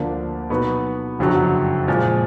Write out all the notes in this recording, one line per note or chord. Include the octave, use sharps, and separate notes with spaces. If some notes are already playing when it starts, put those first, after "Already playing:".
Already playing: D2 D3 F3 A#3 D4
B2 F#3 B3 D#4 F#4
F#1 F2 D3 F#3
A#2 F3 G#3